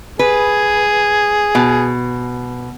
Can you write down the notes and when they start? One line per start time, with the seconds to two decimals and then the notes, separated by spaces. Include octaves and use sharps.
0.19 G#4 B4
1.55 B2